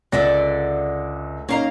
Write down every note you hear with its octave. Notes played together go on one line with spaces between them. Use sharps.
C#2 D3 D5 E5 A#6
A#3 C#4 D#4 F5 A#5